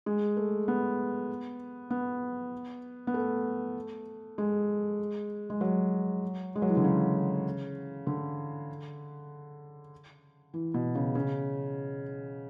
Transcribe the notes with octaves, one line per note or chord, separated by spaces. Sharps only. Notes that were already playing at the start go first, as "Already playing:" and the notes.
G#3
A3
B3
B3
B3
A3
G#3
G#3
F#3
G#3
F#3
E3
D3
C#3
D3
E3
B2
C#3
C#3